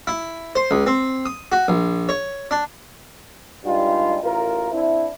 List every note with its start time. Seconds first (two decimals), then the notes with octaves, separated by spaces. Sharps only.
0.07 E4
0.56 C5
0.71 C#2
0.87 C4
1.26 D#6
1.52 F#4
1.68 A#1
2.09 C#5
2.51 D4
3.65 G2 G3 G#3 D#4 F4
4.23 A1 F4 A#4
4.72 C4 D4 E4